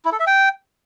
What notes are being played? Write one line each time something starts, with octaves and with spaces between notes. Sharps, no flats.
E4
A4
E5
G5